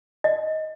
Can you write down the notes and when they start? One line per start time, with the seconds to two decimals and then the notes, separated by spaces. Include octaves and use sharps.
0.24 D#5